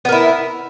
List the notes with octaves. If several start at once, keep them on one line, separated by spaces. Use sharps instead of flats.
B3 E4 A#4